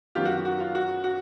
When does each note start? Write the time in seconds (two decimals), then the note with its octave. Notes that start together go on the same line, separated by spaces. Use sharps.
0.15 F#2 D#3 F#3 B3 F4 G4
0.25 F#4
0.45 F#4
0.60 F4
0.75 F#4
1.04 F#4